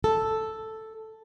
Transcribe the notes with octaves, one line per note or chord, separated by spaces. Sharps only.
A4